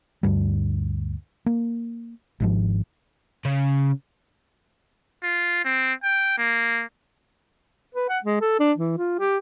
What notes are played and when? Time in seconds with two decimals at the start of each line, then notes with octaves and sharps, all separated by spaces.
0.23 D2 G2 G3
1.46 A#3
2.40 G#1 G#2 F3
3.45 C#3
5.23 F4
5.65 C4
6.04 G5
6.38 A#3
7.95 B4
8.09 F#5
8.24 G#3
8.41 A4
8.59 D4
8.78 E3
8.98 F4
9.19 G4